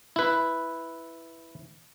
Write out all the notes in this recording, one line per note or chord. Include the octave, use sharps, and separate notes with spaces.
E4 B4